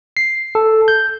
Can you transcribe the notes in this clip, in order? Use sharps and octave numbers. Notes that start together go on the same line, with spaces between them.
C7
A4
G6